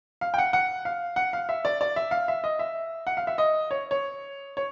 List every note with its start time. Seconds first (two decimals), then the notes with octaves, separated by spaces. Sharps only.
0.21 F5
0.34 G5
0.38 F#5
0.53 F#5
0.85 F5
1.16 F#5
1.33 F5
1.49 E5
1.65 D5
1.81 D5
1.96 E5
2.11 F5
2.28 E5
2.44 D#5
2.59 E5
3.07 F#5
3.17 F5
3.27 E5
3.38 D#5
3.71 C#5
3.91 C#5
4.57 C#5